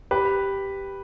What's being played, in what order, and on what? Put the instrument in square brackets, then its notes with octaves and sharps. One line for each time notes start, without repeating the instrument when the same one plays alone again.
[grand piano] G4 B4